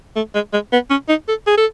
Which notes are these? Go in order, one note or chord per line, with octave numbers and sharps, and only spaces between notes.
A3
G#3
G#3
B3
C#4
D#4
A4
G#4
A4